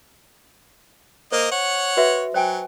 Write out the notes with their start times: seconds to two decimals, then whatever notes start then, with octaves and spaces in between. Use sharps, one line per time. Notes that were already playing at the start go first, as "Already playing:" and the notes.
1.32 A#3 C5 D#5
1.52 C#5 F#5
1.97 F#4 B4 E5
2.34 F#3 C5 G5 G#5